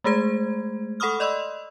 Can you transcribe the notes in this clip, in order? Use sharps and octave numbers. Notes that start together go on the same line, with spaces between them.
G#3 A3 G#4 C5 G#6
A4 F#5 B5 C#6 D#6 F6
D5 D#5 B5 C6 E6